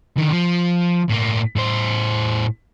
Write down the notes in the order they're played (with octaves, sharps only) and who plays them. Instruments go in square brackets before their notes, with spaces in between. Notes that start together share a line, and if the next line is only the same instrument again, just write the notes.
[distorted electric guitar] D3 D#3
F3
A2 A#3
A2 C5